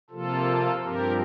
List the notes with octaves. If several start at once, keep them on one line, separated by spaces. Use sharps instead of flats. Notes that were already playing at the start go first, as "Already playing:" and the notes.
C3 F3 A#3 F4 A4
G2 F3 C4 G4 A#4